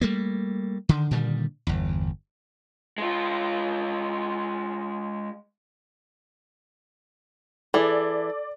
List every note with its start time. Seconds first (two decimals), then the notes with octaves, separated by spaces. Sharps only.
0.01 G3 A3 A#3
0.89 D3 D#3
1.11 A#2 D3 D#3 G3
1.67 G1 E2
2.98 G#3 F4
7.74 E3 G#4 A4 D5